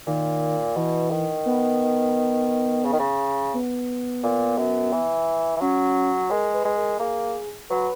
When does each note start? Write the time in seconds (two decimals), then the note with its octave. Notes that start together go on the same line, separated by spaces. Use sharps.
0.07 A#2 D#3
0.76 B2 E3
1.11 D#3
1.46 B3
2.85 C#3
2.93 D#3
3.00 C#3
3.54 B3
4.23 A#2
4.58 F#2
4.92 E3
5.56 E3
5.61 F#3 C#4
6.30 G#3 A#4
6.54 B4
6.65 G#3
6.77 A#4
7.00 A#3 G#4
7.70 F#3 B4